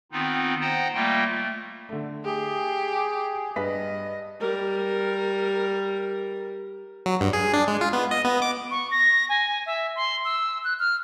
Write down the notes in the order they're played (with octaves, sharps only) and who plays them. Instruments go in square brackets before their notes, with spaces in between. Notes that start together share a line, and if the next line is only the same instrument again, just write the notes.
[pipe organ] D#3 B3 C4 D#4 F4
C5 D#5 F#5 G5 A#5
G3 A3 A#3 F4 D#5 G5
A3
[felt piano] D3 A3
[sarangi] G4 [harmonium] G#4
[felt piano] G2 B4 B6 [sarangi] D#5
[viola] G3 A#4
[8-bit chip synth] F#3
G2
G#4
D4
G#3
F4
B3
D#5
B3
D6
[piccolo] C#6
A#6
G#5
E5
C6
E6
F#6
F6